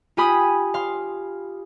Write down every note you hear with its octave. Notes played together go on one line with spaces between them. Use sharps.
F4 G4 G#5 B5 D#6
F5 C6